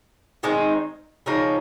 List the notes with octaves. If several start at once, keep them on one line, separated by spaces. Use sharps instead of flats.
D#3 G#3 C4 D#4
C#3 F3 A#3 D#4